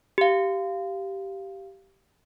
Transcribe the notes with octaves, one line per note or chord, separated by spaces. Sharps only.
G4 F5